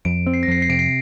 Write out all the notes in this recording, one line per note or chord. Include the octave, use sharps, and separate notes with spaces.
F2 D7
C4
C7
A#6
F2 C7
C7
C3 D7
C7